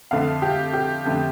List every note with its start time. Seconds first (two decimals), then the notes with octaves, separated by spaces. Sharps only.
0.11 F2 D3 A3 F5
0.42 G4
0.73 G4
1.05 F2 D3 A3